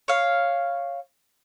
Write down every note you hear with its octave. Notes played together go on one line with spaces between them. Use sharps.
C#5 F5